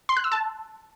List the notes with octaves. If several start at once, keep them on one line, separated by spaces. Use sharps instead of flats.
C6
F#6
E6
A5